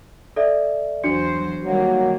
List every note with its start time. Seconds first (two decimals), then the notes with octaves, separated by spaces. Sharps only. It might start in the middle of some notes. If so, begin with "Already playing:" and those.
0.36 A4 D5 E5
1.04 E2 F#3 D4 F#4 C5 C#7
1.65 D#3 F#3 G3 A#3